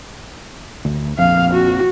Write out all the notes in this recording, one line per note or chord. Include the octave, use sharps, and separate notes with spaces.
D2
A#1 F2 F5
F#4